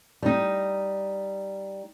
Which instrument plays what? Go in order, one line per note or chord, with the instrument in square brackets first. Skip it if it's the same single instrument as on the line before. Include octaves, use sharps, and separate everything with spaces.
[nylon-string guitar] G3 D#4